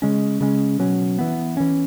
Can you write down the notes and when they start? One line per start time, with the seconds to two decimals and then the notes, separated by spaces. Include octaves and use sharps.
0.02 C#3 G#3 C#4
0.41 C#3 G#3 C#4
0.79 B2 F#3 C#4
1.19 E3 B3
1.57 E3 C#4